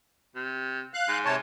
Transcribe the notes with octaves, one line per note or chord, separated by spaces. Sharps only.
C3
F5 F#6
G#2
C3 C#5 A5